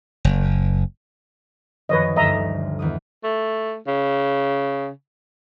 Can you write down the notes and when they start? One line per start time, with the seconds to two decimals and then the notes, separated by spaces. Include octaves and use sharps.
0.25 F#1
1.89 F#2 D#3 F3 B4 C#5 D#5
2.16 G1 D2 G2 D#5 E5 A#5
2.79 E2 D#3 D#6
3.24 A3
3.87 C#3